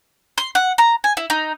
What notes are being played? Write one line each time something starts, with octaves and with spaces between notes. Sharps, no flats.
C6
F#5
A#5
G#5
E4
D#4